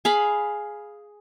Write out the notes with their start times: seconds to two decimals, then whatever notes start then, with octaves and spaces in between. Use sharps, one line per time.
0.05 G#4 F5 B5